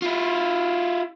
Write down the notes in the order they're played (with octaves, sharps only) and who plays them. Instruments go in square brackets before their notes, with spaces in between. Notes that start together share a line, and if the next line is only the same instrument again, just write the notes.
[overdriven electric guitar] E4 F4